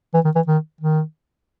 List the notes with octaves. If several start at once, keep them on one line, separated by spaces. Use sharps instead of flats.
E3
D#3
E3
D#3
D#3